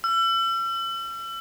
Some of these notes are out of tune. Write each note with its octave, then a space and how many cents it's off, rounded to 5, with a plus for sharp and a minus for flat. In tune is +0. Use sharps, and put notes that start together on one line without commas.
E6 +40